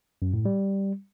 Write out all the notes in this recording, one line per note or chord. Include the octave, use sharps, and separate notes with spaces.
F#2
A2
G3